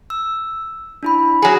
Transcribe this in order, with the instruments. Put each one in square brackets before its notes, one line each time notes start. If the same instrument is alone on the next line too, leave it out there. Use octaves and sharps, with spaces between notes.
[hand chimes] E6
D4 E4 B5
[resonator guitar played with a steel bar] F#3 G#4 [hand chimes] F#5 A#5 C#7